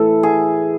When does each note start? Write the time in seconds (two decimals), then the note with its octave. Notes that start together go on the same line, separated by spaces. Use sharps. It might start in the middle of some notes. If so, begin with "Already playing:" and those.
Already playing: A2 E3 A4 B4
0.23 G#4